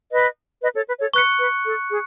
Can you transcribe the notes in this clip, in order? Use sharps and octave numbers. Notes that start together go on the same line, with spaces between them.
B4 D#5
B4 D#5
A4 C#5
B4
A4 C#5
B4 C#6 F#6 C#7
B4
A4
G#4